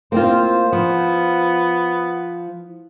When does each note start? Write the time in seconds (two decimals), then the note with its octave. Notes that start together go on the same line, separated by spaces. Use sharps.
0.12 A#3 C4 F4 C5
0.72 F3 B3